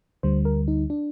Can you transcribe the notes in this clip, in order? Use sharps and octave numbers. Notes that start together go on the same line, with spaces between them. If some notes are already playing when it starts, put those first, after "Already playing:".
D2 D3 G3 C5
A#4
D#4
D4